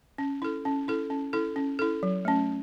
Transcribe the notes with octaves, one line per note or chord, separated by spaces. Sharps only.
C#4
E4 A4
C#4
E4 A4
C#4
E4 A4
C#4
E4 A4
F#3
A3 C#4